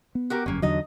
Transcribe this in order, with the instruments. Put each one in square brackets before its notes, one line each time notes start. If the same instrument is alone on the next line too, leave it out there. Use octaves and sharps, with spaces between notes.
[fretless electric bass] B3
[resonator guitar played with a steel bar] F#4 G4 A#4
[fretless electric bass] G1 F#2 [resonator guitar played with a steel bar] A#3 C#4
[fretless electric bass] E2 D3 F#3 [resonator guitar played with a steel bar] D#4 D#5